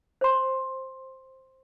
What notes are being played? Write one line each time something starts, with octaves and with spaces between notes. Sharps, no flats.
C5 C6